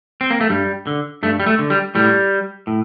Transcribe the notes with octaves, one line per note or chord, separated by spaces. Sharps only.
C4
A#3
A3
G2 G3
D3
G2 A3
G3
A3
D3
G3
A2 G3
A2